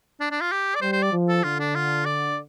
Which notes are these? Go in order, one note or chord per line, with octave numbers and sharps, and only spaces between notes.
D4
D4
F4
G4
D5
G3 C5
C5
D5
F3
A4
D3 F4
D4
F4
D5